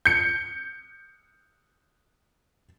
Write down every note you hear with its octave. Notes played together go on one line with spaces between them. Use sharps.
G6 C#7